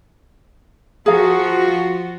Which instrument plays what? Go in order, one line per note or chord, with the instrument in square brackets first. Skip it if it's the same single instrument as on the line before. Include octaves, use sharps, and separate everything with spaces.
[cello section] F3 F4 F#4 [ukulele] G#4 A#4 F5